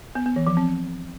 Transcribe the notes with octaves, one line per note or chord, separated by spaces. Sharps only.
B3
B3
E3
F3
C4